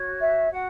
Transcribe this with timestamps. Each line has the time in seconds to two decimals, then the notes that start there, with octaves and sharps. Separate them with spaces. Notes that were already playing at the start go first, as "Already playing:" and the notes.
Already playing: F#4 C#5
0.20 E5
0.51 F#4 F#5